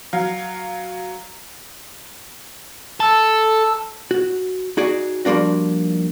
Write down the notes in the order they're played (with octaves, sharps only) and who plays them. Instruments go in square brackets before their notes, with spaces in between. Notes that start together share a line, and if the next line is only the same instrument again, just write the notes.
[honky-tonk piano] F#3 F5
[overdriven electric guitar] A4 [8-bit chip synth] A5 E6
[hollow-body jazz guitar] F#4
D#4 F#4 G#4 D5
F3 G3 A#3 D4 F#4